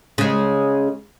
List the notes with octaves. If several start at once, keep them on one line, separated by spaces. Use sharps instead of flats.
C#3 G#3